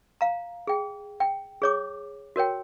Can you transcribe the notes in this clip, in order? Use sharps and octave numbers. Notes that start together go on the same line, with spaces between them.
F5 A#5
G#4 G5
G5
G#4 C#5 D6
F#4 A#4 C#5 G5